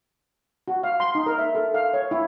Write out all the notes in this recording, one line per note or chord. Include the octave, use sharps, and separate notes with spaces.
F#4
F5
C6
D#4
A#4
E5
A4
F5
C#5
E4